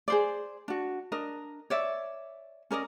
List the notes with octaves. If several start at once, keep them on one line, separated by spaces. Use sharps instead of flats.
G#4 C5 D5
D4 F#4
D4 A#4 D#5
C#5 D5 E5
C#4 A#4 D5 D#5